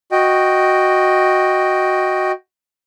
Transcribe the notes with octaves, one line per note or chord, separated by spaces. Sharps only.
F#4 D#5 G5